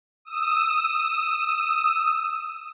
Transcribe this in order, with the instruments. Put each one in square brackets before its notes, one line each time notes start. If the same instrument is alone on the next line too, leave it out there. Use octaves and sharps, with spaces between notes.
[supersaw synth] D#6 E6